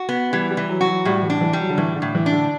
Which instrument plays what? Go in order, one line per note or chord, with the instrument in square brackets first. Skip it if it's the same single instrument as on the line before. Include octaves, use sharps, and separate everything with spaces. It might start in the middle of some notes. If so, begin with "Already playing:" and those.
Already playing: [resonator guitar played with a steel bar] F#4
B3
[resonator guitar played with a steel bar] E3 [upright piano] G3
[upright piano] G3
[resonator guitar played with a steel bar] E3
[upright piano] F#3
[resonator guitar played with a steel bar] F#4
[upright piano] F#3
[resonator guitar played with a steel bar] A2 [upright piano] G3
[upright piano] E3
[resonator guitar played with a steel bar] D4
[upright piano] E3
[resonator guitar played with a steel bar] G3
[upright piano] F#3
D3
[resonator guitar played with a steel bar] A2 [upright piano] E3
[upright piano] D3
[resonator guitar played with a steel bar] A2
[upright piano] E3
[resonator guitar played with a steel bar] D4
[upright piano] D3